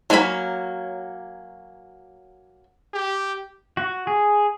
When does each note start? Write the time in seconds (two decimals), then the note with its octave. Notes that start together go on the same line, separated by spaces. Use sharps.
0.10 F#3 A#3 C#4 F#4 B5
2.93 G4
3.77 F#4
4.07 G#4